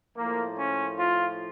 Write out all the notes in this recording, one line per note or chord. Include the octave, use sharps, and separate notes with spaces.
A2 F3 A#3
C#4
F4